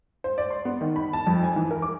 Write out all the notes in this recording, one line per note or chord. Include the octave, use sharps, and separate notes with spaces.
C5
D5
C6
B3
D#3
B5
A5
F2
G#5
E3
A#4
D6